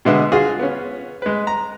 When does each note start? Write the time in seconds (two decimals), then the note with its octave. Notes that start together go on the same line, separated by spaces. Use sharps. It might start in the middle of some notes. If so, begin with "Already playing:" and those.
0.05 B2 D3 G#3 B3 E5
0.32 F4 F#4 G#4
0.59 B3 C#4
1.22 G#3 B4
1.47 A#5